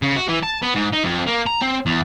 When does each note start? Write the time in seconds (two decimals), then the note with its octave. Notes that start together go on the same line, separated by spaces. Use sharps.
0.02 C#3
0.16 F#4
0.28 E3
0.43 A5
0.62 B3
0.75 G#2
0.93 D#4
1.04 F2
1.27 A#3
1.46 A#5
1.61 C4
1.86 E2